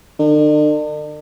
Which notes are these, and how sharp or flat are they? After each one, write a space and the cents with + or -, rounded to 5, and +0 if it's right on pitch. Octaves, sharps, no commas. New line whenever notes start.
D3 +45